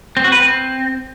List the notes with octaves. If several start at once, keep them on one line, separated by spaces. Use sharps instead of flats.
C4
F#4
B4
C4